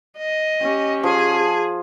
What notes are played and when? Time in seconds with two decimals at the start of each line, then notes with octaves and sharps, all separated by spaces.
0.18 D#5
0.60 C#4 G4
1.03 F3 G#4